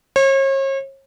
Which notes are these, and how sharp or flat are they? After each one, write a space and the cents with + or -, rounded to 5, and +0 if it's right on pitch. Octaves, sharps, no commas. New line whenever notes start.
C#5 -40